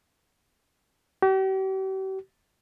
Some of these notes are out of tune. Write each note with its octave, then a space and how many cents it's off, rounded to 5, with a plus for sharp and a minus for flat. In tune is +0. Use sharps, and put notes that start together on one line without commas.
G4 -45